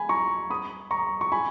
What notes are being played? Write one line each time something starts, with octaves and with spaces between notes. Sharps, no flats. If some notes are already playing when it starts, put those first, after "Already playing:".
Already playing: G#5 B5
A#5 C#6
B5 D#6
A#5 C#6
C#6
G#5 B5